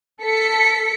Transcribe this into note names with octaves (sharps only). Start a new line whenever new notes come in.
A4 B6 C#7